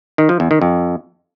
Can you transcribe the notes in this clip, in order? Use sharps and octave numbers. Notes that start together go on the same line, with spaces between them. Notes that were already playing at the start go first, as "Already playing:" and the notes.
D#3
F3
E2
D#3
F2